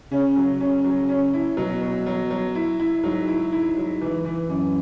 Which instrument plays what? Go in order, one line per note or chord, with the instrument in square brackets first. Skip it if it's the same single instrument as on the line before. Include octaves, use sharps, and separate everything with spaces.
[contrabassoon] C#3 [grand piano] C#4
[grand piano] F#3
[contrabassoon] C#3 [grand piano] C#4
[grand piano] F#3
C#4
E4
[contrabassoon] B2 [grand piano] F#3
[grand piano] F#3
F#3
F#3
E4
E4
[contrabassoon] G#2 [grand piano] F#3
[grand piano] E4
[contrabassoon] G#2 [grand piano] E4
[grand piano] F#3
E3
E3
[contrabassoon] F#2 [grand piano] E3